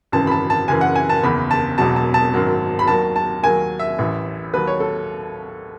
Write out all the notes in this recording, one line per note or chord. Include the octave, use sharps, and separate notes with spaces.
G#1 F#2 C#3 E3 A5
B5
A5
A5
F#1 F#2 C#3 E3 G#5
F#5
G#5
A5
F#1 E2 D#3 B5
A5
E1 E2 B2 F#3 A5
A5
A5
G#1 F#2 D#3 F#3
B5
D#2 D#3 F#3 A5
A5
D#2 D#3 F#3 G#5
E5
A1 A2 E3
D#2 D#3 F#3 B4
C#5
A4